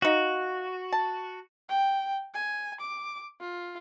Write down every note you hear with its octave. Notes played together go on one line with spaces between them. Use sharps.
D#4 F#4 F5
A5
G5
G#5
D6
F4